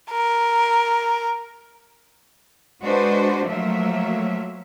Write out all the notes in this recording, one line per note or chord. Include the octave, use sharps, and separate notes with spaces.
A#4
G#3 D4 F#4 B4 C5
F3 F#3 A3 A#3 E5